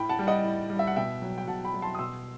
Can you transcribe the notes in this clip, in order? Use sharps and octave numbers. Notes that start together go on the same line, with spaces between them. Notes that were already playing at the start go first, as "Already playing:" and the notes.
Already playing: A2 G5 B5
F#5 A5
G3
D#5 F#5
A2
G3
E5
F#5
B2 E5 G5
F#3
G5
B2 F#5 A5
G5 B5
F#3
A5 C6
D#6
B2 C6 E6